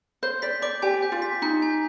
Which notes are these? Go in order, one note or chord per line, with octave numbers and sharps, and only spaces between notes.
C5 G6
D5 B6
D5 D6
G4 G#5
G6
F4
B6
D#4 G6
G#5